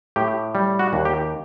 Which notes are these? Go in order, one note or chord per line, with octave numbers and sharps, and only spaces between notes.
A2 G4
G3
F#4
D#2
G4